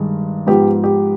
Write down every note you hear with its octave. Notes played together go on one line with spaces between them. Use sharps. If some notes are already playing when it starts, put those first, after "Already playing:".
Already playing: G2 D#3 G#3
G#2 F3 B3 G4
G4